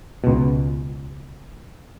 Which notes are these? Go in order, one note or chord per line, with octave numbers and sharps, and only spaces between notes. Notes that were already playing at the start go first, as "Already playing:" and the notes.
C#2 B2